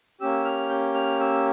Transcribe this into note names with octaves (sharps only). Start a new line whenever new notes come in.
A#3 C#4 G4 E6
F6
G6
F6
E6